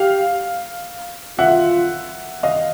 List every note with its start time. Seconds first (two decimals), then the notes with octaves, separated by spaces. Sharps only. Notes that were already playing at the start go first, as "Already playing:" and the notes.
Already playing: G4 F5
1.38 F4 E5 F#5
2.43 D#5 F5